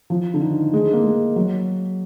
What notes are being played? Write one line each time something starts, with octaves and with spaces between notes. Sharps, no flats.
F3
D3
D#3
G#3
A#3
G#3
F#3